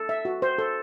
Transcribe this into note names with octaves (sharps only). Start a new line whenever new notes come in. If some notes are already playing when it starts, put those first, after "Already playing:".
Already playing: A4
E5
F#4
C5
A4